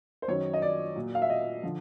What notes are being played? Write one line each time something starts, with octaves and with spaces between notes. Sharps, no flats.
C5
F#2 D#3 F#3 C#5
D#5
D5
A#2 F#3
F5
E5
D#5
D3 F3